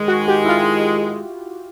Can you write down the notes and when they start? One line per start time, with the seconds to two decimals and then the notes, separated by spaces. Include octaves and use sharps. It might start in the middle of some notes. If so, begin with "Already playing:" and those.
Already playing: G#2 D#3 G#3
0.08 F#4
0.28 G4
0.45 E4
0.49 F4